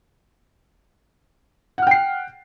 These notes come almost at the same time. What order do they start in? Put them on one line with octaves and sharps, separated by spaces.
F#5 F6 G5 C7